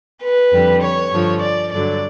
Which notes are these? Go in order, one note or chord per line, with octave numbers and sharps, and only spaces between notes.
B4
F2 D3 G3
C#5
G2 D3 F3
D5
G2 D3 F#3 D5